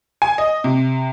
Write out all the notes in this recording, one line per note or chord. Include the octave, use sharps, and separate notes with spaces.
G#5
D#5
C3